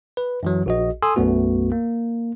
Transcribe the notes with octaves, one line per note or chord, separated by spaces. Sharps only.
B4
F#2 E3 F#3
A#1 F#4 D#5
A4 G#5 C6 D#6 E6
B1 F#2 A3 B3 F#4
A#3